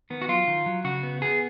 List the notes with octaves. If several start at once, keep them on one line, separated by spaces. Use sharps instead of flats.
D#3 B3
F#4
F#3 F4
D#3
F#3
C#3 F#4
B3
B3 G#4